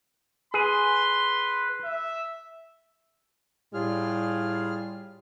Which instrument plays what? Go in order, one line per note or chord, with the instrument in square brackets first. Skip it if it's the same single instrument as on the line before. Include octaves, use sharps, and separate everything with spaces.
[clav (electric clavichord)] G#4 [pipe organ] B4 [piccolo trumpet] C6
[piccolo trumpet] E5
[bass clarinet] A2 [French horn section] G3 [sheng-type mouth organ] F4 G#4 F6